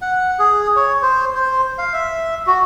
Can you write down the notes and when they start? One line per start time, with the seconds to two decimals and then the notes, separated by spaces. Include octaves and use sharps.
0.02 F#5
0.39 G#4
0.76 C#5
1.02 C5
1.35 C5
1.78 F5
1.93 E5
2.47 F#4